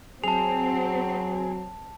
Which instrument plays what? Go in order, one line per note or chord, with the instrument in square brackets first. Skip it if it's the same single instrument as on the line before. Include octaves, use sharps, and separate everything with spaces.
[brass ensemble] F#3 [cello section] C4 [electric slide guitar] G#4 [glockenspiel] A5 F7